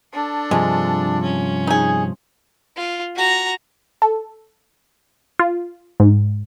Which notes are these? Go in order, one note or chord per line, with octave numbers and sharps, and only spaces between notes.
D4 A4
G2 C3 F3 G#3
C#4
D#4 G#4
F4
F#4 A#5
A4
F4
G#2